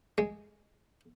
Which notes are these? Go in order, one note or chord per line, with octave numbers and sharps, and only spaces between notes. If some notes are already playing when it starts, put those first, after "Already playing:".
G#3